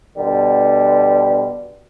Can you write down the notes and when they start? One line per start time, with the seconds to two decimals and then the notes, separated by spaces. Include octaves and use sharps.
0.18 B2 D3 G3